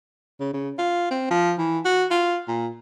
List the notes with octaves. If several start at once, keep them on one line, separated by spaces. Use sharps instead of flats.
C#3
C#3
F4
C4
F3
E3
F#4
F4
A#2